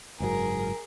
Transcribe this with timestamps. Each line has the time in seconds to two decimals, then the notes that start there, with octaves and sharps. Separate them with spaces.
0.20 F#1 G#2 F#3 G#4 A#4